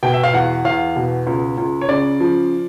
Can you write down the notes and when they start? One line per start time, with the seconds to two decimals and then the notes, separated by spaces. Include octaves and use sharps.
0.03 B2 G5
0.14 E5
0.23 F5
0.34 E2 F#5
0.65 E2 F5
0.96 B2
1.27 C#2
1.58 C#2
1.81 C#5
1.89 C#3 D5
2.20 F3